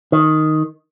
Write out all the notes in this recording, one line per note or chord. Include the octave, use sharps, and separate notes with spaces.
D#3